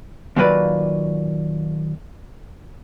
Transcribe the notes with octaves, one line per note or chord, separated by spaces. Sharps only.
D#2 A#2 F#3 A#3 B4 D5